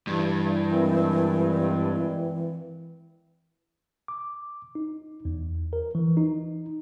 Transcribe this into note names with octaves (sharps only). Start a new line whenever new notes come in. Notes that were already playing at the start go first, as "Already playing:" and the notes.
G2 E3
A#2 G#3 C4
D6
D#4
E2
A#4
E3
D#4